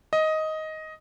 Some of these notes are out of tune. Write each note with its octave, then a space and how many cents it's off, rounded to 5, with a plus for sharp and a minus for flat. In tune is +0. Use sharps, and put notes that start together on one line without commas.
D#5 +10